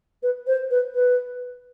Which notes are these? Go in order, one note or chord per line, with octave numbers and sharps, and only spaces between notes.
B4
C5
B4
B4